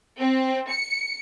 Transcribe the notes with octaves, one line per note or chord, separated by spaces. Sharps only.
C4
C#7